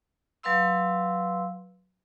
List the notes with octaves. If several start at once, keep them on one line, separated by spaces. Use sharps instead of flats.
F#3 B4 F5 C6 E6